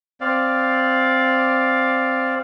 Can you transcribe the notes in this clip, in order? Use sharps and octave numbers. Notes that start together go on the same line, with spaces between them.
C4 D5 F5